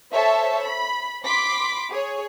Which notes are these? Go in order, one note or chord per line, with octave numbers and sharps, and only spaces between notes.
A4 C5 C#5 E5 A5
B5
B5 C6 D6 B6
G#4 C#5